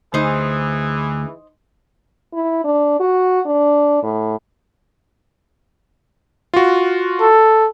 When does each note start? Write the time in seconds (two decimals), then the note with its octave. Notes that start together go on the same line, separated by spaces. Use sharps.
0.14 D2 E3 D#4 G#4 C5
2.33 E4
2.64 D4
3.00 F#4
3.46 D4
4.03 A2
6.54 F4 F#4
7.21 A4